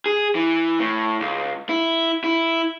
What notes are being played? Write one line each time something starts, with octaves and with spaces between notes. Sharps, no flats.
G#4
E3
A2
C#2
E4
E4